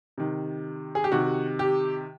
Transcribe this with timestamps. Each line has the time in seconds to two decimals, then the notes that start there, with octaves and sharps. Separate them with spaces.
0.18 C3 D#3
0.95 G#4
1.04 G4
1.12 C3 D#3 F#4
1.59 G4